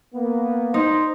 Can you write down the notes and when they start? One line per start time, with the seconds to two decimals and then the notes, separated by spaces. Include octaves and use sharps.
0.15 A#3 B3
0.74 D#4 C5